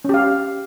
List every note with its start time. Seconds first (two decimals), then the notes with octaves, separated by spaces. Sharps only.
0.05 C#4
0.09 G4
0.14 F5